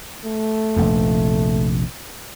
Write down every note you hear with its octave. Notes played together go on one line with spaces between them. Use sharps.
A3
F1 A#1 F2